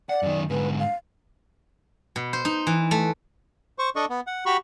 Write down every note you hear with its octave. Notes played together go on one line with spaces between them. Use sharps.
D5 F#5
F#2 D#3
G#2 D3 B4
F5
B2
C5
D#4
E3
A3
C5 C#6
D4 A4 D#5 C#6
B3
F#5
F#4 G4 B5 C#6